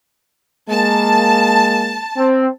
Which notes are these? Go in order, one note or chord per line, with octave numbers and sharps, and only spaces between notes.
G#3 A#3 A5
C4